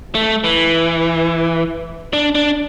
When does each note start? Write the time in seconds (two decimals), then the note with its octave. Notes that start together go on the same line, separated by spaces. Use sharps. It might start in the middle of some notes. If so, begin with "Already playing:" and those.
0.15 A3
0.44 E3
2.13 D4
2.35 D4